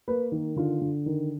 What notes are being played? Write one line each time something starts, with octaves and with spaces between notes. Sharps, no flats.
A#3 B4
D#3
D3 F4
D3
D#3